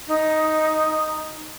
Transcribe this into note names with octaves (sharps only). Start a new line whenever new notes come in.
D#4